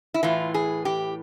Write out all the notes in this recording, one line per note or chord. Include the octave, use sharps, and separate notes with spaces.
E4
A2 E3 F4
G#4
G4